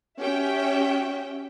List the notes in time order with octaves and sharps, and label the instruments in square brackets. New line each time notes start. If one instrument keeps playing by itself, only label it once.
[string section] C#4 F#4 G4 E5 G5